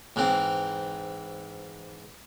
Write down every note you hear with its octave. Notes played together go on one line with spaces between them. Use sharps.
G#2 E3 C4